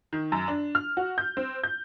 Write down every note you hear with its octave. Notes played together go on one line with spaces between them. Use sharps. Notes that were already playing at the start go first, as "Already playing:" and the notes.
D#3
F#2
D4
F6
F#4
G6
C4
G6